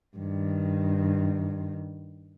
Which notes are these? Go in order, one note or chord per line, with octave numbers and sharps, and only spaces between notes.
G2 D#3